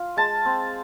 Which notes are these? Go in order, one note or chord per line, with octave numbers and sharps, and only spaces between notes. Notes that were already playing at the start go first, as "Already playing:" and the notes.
Already playing: F4
G#3 A5
C4